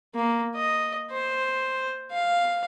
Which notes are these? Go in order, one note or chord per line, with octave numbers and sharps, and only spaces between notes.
A#3
D#5
C5
F5